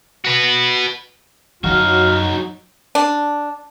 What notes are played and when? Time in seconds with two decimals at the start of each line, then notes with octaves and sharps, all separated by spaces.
0.25 F#4 B4
1.64 F#2 F#3 D#4 F#4 F5
2.95 D4